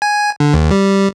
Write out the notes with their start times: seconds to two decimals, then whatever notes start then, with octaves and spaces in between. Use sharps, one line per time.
0.02 G#5
0.40 D3
0.54 D#2
0.71 G3